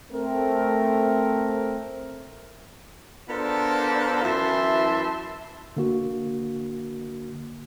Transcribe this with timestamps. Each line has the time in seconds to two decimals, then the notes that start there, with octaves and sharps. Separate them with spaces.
0.11 A3 C4 A#4
3.29 B3 D4 F4 A4 A#4 C5
4.23 F#2 E3 E4 E5 A5 C6
5.77 D3 A#3 F#4